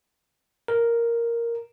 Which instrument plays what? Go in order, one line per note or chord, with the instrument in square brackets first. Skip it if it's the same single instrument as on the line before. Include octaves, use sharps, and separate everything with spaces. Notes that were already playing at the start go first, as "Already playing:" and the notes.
[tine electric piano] A#4